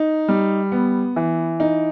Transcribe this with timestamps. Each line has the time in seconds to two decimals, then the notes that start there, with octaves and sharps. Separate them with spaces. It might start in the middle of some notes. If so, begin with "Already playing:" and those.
Already playing: D#4
0.28 G3
0.72 B3
1.16 E3
1.60 D#4